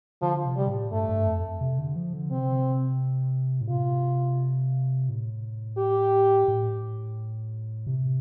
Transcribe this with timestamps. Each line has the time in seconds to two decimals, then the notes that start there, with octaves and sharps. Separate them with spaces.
0.22 D3 F3
0.45 C3
0.56 G3
0.68 A2
0.92 G2 A3
1.09 G2
1.27 F2
1.61 C3
1.78 D3
1.96 F3
2.14 D3
2.31 C3 C4
3.61 A2
3.69 C3 F4
5.09 A2
5.78 G4
6.48 A2
7.87 C3